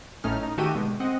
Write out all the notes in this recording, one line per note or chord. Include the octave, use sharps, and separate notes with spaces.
A1 A2 A3 C#4 D#4 F6
D#4
D#3 A3 F#4 G4 G5 D#7
B2 D3 G#3
C4 D#5 F#5